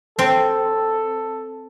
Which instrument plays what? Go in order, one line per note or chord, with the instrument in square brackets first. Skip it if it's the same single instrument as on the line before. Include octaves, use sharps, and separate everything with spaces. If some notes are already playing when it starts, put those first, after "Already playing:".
[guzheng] C4 [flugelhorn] A4